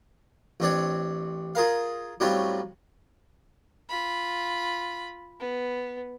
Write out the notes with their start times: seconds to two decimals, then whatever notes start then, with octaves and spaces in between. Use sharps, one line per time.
0.60 A1 C4 D4 C#5
1.55 F4 G#4 A#4 F5
2.20 A2 F#3 G3 C4 C#4 F4
3.89 F4 B5
5.40 B3